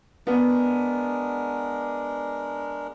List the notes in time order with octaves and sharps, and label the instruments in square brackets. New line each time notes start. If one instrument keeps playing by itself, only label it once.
[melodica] G#3 D4 A#4 [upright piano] B3